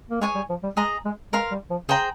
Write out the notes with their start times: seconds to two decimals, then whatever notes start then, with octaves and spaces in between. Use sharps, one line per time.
0.11 A#3
0.21 G#3 G#4 C#5 G#5
0.35 G3
0.49 F3
0.63 G3
0.77 G#3 G#4 D#5 A#5
1.05 G#3
1.33 G#3 A#4 F5 C6
1.51 G3
1.70 F3
1.89 C#3 G#4 C5 G5 A#5